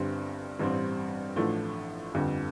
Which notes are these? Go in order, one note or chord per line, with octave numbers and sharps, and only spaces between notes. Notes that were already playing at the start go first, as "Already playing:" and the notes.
Already playing: G1 G2 G3 C4
A1 G2 G3 C4
A1 A2 F3 A3 D4
G1 F2 D3 G3